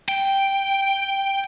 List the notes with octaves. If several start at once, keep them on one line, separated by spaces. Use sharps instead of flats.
G5